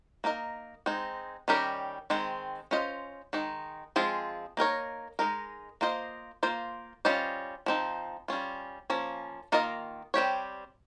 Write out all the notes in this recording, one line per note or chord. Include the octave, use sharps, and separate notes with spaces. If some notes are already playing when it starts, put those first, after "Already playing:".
A#3 D#4 A#4 D#5
G#3 C4 D#4
D#3 G3 C#4 G4 A#4
D#3 G#3 C4
C#4 F4 C5 D#5
D#3 G#3 D#4
F3 G#3 C4 F4 G#4
A#3 D#4 A#4 C#5
G#3 D#4 A#4
A#3 F4 C5 D#5
A#3 F4 C5
G3 C#4 F4 C5 D#5
F3 C4 D#4
G3 C#4 F4
F3 A#3 C#4
D#3 A#3 F4 A#4 D#5
G3 C4 G4 C#5